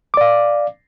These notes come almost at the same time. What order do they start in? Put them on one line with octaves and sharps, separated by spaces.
D6 D5 F5